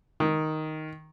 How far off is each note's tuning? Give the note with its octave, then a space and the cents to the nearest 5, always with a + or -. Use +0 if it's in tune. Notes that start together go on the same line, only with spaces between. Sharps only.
D#3 +5